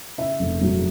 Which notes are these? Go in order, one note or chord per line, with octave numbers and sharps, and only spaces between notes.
C#3 E5
F1
F#3